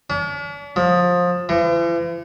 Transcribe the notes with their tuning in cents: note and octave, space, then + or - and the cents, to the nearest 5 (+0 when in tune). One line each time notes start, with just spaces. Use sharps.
D4 -45
F3 +25
E3 +45